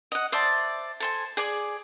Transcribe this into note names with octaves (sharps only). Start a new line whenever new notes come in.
D#5 F#5
C5 D5 E5 A5
A4 C5 G#5
G#4 D5 G#5